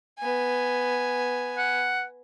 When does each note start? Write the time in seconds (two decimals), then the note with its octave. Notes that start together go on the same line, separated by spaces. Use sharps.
0.19 B3 G#5
1.58 F#5